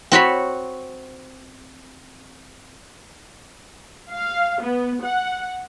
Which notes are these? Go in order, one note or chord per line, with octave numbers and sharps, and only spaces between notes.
C4 F#4 C#5 B5
F5
B3
F#5